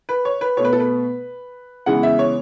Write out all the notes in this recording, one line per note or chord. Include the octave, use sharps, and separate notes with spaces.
B4
C#5
B4
B2 A3 C#5
B4
A4
B4
C#3 E3 G#3 B3 F#5
E5
C#5